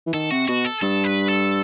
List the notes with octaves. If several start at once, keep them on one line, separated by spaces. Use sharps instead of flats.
E3
D#3 A4
C3 F#4
B2 F#4
A4
G2 A4
B4
A4